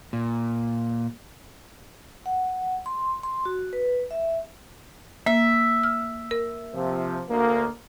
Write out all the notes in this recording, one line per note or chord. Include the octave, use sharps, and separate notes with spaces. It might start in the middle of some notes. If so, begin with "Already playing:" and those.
A#2
F#5
C6
C6
F#4
B4
E5
A#3 E5
F6
A#4
C3 F3
D2 A#3